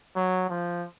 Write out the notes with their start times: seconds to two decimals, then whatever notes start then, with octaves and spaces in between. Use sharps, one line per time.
0.16 F#3
0.49 F3